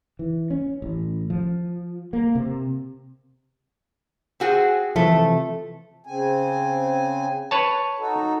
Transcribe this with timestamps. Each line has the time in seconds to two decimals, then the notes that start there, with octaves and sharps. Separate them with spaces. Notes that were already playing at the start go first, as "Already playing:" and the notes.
0.19 E3
0.50 C#4
0.82 A1
1.30 F3
2.13 A#3
2.35 C3
4.40 C4 F#4 G#4
4.96 C3 E3 F3 A3
6.06 C#3 C4 G#5
7.51 B4 C#5 A5
7.99 D#4 F#4 A4